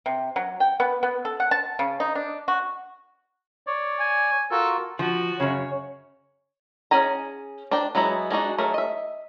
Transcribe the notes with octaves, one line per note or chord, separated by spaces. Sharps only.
C3
F#3
G5
B3
B3
A4
F#5
A5
C#3
D#4
D4
F#4
C#5 D5
G#5
F4 F#4 A4 A#4
F3 F#4
F#2 C#3 C#5
C#4 G#4 G#5 A#5
D4 A#4 C5 G5
F#3 G#3 B3 E4 A#5
G#3 D4 D#4 F#4
F#3 A3 G#4 A#4
D#5 E5